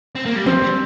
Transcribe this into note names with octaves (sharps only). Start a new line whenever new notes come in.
C4
A#3
G3
F3 C4
G3